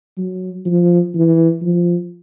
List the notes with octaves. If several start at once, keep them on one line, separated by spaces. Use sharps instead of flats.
F#3
F3
E3
F3